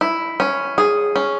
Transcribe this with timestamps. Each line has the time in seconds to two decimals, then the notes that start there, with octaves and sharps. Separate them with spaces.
0.01 E4
0.40 C#4
0.78 G#4
1.16 C#4